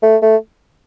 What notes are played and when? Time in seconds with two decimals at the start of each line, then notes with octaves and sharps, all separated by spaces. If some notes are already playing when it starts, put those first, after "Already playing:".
0.03 A3
0.22 A3